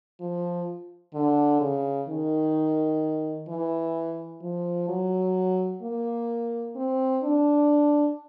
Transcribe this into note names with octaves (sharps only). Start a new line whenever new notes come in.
F3
D3
C#3
D#3
E3
F3
F#3
A#3
C4
D4